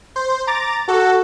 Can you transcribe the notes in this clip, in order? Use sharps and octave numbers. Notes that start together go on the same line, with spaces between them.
C5
A#5 D6 A6
F#4 A4